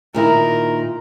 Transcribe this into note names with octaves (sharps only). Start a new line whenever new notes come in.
A#2 D#3 E4 A#4